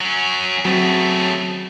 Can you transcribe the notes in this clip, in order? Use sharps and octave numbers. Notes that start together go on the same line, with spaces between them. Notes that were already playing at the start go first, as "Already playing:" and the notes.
F#3 C#4
C#3 F#3 A3 C4